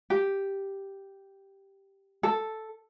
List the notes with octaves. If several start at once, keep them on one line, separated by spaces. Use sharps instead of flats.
G4
A4